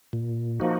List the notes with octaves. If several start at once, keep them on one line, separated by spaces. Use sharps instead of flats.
A#2
F3 A#3 D#4 F#4